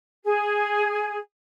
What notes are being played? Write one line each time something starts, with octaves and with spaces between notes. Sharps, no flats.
G#4